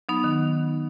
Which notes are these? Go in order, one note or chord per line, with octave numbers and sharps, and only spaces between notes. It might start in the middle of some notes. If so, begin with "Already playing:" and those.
F#3 B3 D#4
D#3